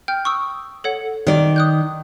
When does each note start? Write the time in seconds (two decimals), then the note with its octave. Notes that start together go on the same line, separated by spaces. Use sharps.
0.08 G5 F6 G6
0.25 C#6 D#6 E6
0.84 A4 C#5 F#5
1.27 D#3 D5
1.56 D#6 F#6 G6